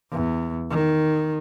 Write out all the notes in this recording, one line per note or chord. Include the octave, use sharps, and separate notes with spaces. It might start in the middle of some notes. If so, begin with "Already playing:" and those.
E2
D#3